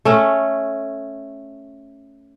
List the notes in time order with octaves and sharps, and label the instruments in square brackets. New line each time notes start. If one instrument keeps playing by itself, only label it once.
[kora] A3 C#4